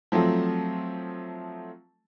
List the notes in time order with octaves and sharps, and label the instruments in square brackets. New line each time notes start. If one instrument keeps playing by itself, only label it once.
[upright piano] F3 F#3 A3 C4